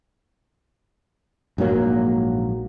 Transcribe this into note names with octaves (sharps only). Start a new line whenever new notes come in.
A#1 G#2 F#3 A#3